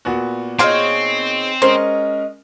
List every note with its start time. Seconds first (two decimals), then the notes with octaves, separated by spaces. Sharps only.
0.05 A#2 B3 F#4
0.59 C4 D#4 F4 G#4 C#5 F5 C6
1.62 G#3 C#4 A#4 C5 D#5